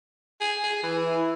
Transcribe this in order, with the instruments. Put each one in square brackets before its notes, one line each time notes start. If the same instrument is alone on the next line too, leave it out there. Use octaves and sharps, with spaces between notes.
[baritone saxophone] G#4
G#4
E3
[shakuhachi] E4